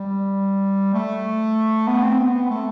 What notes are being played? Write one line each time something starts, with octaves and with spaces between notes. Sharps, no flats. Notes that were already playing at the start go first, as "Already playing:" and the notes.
Already playing: G3
A3
B3
C4
B3
B3
A3